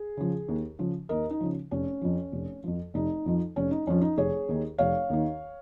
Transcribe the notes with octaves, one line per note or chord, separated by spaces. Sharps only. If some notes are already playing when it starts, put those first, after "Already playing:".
Already playing: G#4
C#3 F3
D#2
C#3 F3
D#2 A#4 D#5
D#4
C#3 F3
F1 C#4
F2 F3
F1
F2 F3
F1 D#4
F2 F3
F1 C#4
D#4
F2 F3 C#4
D#4
F1 G#4 C#5
D#2 D#3
F1 C#5 F5
D#2 D#3